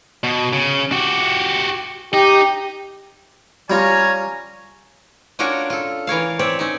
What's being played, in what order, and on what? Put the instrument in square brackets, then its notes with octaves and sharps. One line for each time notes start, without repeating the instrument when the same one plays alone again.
[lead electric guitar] B2
C#3
F#4 G4
[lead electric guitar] D#4 [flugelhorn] G4
[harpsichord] G3 C#4 F4 [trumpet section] C#5 G#5 A#5
[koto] C#4 D4 F4 F#4 A#4 C#5
F4 A4
E3 A#4 C#5 F5
C4 C#5 D5 E5
C#4 D#4